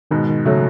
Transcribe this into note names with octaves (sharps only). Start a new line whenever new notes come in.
G#2 B2 D#3
D#3
C#3 F#3 A3